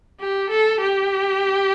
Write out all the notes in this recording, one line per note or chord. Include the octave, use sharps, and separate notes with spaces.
G4
A4
G4